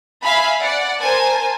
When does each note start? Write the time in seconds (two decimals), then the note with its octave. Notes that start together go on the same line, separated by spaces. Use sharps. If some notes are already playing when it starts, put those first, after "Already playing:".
0.23 E5 F5 G#5 B5
0.61 D5 F#5
1.00 A#4 C5 G#5 A5